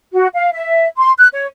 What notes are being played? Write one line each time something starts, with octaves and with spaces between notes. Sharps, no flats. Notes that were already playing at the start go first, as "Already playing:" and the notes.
F#4
F5
E5
C6
F#6
C#5